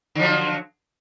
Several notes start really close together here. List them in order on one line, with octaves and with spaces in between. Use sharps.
D3 F3 F#3